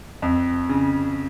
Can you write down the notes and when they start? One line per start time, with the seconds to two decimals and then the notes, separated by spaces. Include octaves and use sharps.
0.22 F2
0.69 C#3